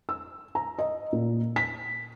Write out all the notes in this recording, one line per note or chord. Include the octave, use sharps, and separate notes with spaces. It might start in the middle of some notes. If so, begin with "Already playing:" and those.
E6
A#5
D#5
A#2
B6